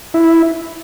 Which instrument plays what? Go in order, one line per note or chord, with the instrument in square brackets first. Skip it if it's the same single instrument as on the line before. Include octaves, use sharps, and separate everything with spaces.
[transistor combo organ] E4